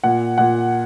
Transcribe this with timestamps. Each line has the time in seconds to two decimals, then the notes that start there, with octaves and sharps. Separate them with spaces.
0.04 A#2 F#5
0.38 A#2 F#5